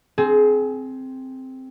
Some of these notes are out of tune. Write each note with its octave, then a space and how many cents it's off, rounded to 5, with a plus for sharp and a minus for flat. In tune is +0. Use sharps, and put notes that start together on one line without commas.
C4 +0 G#4 +25